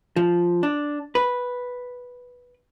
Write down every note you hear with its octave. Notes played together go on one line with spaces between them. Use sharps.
F3
D4
B4